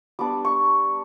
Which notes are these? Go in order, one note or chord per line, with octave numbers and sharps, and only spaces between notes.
G3 B3 D4 D6
C#6